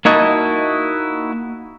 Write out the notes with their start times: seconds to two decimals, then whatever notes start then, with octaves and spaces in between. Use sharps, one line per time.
0.05 A#3 D#4 E4 F#4 D#5 A5